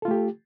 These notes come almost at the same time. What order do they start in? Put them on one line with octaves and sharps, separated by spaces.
A4 F4 A3 G4